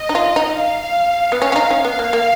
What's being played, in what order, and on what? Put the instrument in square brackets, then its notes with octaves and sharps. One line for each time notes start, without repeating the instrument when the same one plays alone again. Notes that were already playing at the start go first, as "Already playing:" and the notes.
Already playing: [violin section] D#5
[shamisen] D#4
F4
D#4
[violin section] F5
[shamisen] B3
[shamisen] C#4 [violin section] F5
[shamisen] C#4
D#4
C#4
[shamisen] B3 [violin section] F5
[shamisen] A#3
A#3